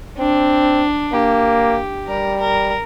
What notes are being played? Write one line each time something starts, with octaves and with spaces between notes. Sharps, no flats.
C4 D4
A#3 G4
G3 A#4
A#4